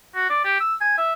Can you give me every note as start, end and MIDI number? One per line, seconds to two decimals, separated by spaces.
0.15 0.28 66
0.30 0.39 74
0.44 0.59 67
0.60 0.75 88
0.81 0.94 80
0.98 1.13 76